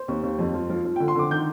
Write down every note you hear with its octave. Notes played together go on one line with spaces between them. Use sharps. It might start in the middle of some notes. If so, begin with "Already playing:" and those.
Already playing: C5
D#2
D#2
F2
F3
F3
F3
D3 G5
C6
D3 D6
D#3 G6